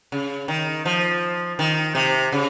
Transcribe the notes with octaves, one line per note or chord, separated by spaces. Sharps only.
C#3
D#3
F3
D#3
C3
C#3